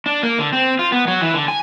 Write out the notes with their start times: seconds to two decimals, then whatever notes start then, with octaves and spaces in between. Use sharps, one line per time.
0.06 D4
0.23 A#3
0.39 D3
0.53 C4
0.79 F4
0.92 B3
1.08 F#3
1.21 E3
1.34 D3
1.48 G#5